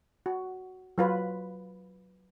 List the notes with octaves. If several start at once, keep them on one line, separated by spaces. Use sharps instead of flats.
F#4
F#3 F4 B4